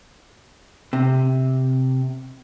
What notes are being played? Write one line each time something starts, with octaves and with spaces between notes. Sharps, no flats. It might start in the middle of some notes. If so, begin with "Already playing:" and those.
C3